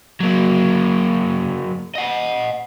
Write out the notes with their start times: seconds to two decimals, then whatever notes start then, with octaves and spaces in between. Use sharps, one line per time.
0.21 F#3 A#3
1.95 D#5 F#5